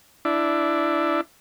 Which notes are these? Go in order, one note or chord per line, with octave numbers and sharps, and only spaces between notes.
D4 E4